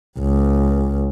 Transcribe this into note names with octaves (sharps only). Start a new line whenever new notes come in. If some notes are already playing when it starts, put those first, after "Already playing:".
C#2